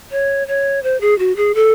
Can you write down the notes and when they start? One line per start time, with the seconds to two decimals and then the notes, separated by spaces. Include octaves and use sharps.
0.11 C#5
0.47 C#5
0.83 C5
1.01 G#4
1.19 F#4
1.36 G#4
1.55 A4